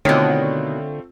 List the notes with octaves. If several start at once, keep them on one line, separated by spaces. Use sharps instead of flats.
B2 D3 D#3 A3 C4 F4 C#5 G5